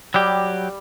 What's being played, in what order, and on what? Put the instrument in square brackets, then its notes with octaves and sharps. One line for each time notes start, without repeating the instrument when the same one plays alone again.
[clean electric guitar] F#3 G4 [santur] G3